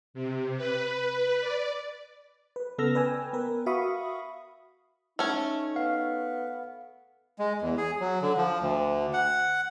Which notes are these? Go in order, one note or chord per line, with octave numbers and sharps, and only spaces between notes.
C3
B4
B4
D5
B4
C#3 B3 A4 E6 F6 A#6
B4 D5 G5 G#5 E6
B3 A#4 B4
F#4 E5 F5 B5 C#6 D#6
A3 C#4 D#4
B3 F5
G#3
E2
G#4
F#3
D3
F3
D2
F#5